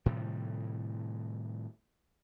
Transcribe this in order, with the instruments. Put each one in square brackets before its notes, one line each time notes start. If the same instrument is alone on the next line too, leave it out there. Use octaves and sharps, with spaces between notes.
[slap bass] A2 C3 D#3 G3